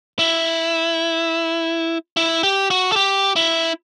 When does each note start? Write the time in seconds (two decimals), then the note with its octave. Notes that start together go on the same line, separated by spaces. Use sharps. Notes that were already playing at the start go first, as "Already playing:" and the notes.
0.19 E4
2.17 E4
2.43 G4
2.70 F#4
2.92 A4
2.96 G4
3.36 E4